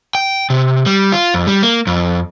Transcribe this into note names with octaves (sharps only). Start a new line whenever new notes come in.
G5
C3
G3
F4
F2
G3
A#3
F2